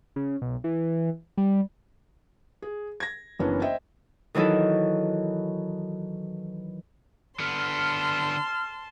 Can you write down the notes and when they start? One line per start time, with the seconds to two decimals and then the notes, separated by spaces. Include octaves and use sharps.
0.16 C#3
0.42 B1
0.64 E3
1.38 G3
2.62 G#4
3.00 G#6 A#6
3.39 F#1 E3 B3 C#4 D4
3.62 C5 D#5 E5 G5
4.34 D#3 E3 F#3 D#4 E4 A4
7.40 D3 B3 A5 C6 F6